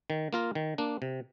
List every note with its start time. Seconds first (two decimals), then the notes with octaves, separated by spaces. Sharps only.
0.10 D#3
0.33 A#3 F4 A#4
0.55 D#3
0.78 A#3 D4
1.02 C3